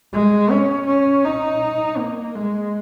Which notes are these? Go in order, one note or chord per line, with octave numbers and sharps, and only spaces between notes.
G#3
C#4
C#4
D#4
A#3
G#3